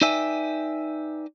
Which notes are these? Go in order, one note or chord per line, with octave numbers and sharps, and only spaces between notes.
D#4 B4 D5 E5 G5 G#5